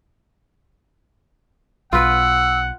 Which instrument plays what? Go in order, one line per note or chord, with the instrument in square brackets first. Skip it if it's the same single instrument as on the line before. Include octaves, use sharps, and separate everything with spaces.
[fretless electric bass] B1 [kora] F4 B4 [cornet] F#5 [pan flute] E6